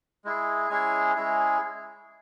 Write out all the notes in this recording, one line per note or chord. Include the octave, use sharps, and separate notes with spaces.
G#3 E4 G#4
G#3 C#4 E4 G#4 G#5
G#3 C#4 E4 G#4